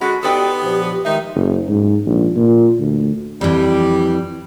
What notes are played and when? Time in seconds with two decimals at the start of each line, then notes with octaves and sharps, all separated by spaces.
0.01 D3 G#3 C#4 F#4 B5
0.23 B3 D#4 G4 A4 D5 G5 C6 D#6
0.61 G2 A#2 F3 F#3
1.05 D#3 G#3 D#4 E5
1.35 F#1
1.69 G#2
2.06 A#1
2.36 A#2
2.80 D2
3.41 F2 E3 G3